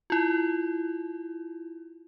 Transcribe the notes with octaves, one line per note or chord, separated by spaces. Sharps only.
E4 F4